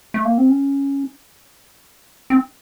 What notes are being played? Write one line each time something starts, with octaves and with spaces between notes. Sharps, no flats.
A3
A#3
C4
C#4
C4